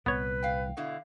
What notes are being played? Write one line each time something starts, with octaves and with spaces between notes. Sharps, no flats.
C2 A#2 B3 B4 C#5
F5 G5
B2 D3 E4 F5